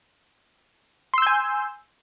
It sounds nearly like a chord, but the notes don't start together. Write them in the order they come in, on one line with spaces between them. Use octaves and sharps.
C6 E6 G6 G#5